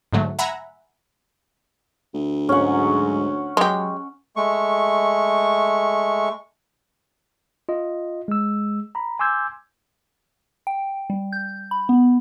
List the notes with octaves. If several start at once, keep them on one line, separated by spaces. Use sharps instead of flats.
G#2 D3 F#3 A3
E5 F#5 G#5 A#5 B5
D2
G#2 F#3 G#3 C#4 F#5
F#3 G#3 G4
G#3 A3 C#6
F4 D#5
G#3 E6
A#5 B5
G#5 C6 D6 E6 G6 G#6
G5
G3
G6
B5
B3